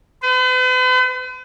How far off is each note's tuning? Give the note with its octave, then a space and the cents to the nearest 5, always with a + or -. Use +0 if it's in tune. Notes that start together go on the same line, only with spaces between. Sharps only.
B4 +45